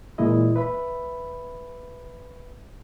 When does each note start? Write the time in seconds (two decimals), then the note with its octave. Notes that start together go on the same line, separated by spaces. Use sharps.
0.18 A#2 E3 G#3 E4 D#5
0.56 B4 E5 B5